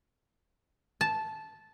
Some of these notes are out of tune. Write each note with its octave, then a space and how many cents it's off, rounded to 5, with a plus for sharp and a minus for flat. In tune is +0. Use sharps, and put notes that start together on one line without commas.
A5 -10